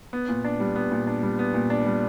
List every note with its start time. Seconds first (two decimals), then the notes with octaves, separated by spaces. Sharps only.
0.13 B3
0.29 A#2
0.45 D4
0.60 G3
0.76 B3
0.92 A#2
1.07 D4
1.23 G3
1.39 B3
1.54 A#2
1.70 D4
1.86 G3